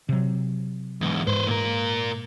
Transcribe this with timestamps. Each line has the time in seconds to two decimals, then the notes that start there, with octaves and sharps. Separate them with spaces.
0.09 C3 F#3
1.01 E2 G#2
1.27 G#2 B4 C5
1.47 A#2 A#4